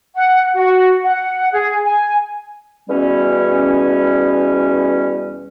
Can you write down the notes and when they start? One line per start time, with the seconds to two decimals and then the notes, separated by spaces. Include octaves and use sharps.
0.16 F#5
0.55 F#4
1.03 F#5
1.52 G#4
1.84 G#5
2.89 E2 B2 G3 C#4